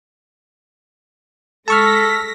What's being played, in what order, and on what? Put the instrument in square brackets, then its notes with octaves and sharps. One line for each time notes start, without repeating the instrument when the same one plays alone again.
[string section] G#3 A#6 B6 [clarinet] A4 [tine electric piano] A5 C#6 F6 [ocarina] E6